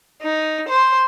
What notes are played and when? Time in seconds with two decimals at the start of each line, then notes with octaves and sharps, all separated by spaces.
0.23 D#4
0.69 C5